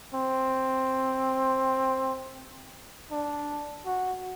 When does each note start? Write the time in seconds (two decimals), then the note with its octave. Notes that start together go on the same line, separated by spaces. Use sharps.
0.14 C4
3.11 D4
3.86 F#4